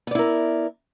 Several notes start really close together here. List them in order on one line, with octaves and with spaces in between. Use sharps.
B3 D5 E4 A#4